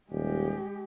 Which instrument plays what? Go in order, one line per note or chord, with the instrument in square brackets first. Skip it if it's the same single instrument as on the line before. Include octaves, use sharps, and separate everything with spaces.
[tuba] D#1 [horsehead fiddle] G#3 G4